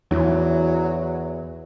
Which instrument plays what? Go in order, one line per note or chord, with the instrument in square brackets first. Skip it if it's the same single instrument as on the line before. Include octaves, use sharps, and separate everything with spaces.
[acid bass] E2 [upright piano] E3 [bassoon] F#3